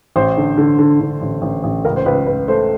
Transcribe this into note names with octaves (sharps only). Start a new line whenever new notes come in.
A1 C5
D3
D3
D3
D3
A1
A1
A1
C#2 A#4
C5
C#2 B4
C#2 B4
A3 C5